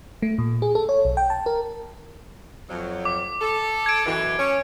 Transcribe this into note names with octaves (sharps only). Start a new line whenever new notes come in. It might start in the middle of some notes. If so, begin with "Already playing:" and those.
A3
A#2
G#4
A4
C#5
B1
G5
A5
A#4
F2 F#3
D6
A4
G#6 D7
F#2 B2 E3
C#4